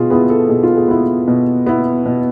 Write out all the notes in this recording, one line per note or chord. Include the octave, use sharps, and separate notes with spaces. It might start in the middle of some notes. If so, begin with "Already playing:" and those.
Already playing: B2 F4 G#4
B3 E4 G#4
A4
B2 G#4
F4
G#4
B3 E4
B2
B3 E4
B2